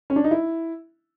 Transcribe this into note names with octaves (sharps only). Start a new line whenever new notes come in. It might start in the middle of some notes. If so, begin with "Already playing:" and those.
C#4
D4
D#4
E4